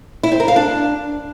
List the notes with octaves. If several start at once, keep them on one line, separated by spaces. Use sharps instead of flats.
E4
C4
A#4
F5
D4